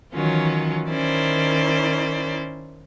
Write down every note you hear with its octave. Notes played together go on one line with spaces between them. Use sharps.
D#3 E3 F#3 C#4 F4
D#3 C#4 E4 A#4 C5 D5